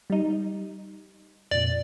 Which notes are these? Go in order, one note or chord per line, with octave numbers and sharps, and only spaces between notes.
G3 D#4
F2 A#2 D5